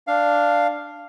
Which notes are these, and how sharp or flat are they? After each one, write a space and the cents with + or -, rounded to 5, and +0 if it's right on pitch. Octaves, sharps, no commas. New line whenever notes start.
D4 +0 F5 -5